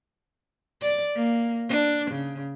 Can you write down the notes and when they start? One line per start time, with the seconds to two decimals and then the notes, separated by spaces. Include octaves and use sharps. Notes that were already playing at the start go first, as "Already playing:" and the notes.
0.82 D5
1.15 A#3
1.69 D4
2.11 C#3